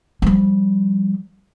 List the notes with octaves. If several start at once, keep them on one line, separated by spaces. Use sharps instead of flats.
F3 G3